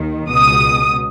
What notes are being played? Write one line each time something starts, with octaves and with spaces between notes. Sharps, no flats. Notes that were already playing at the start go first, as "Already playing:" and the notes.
Already playing: D#2 D#3
C#2 B2 D#6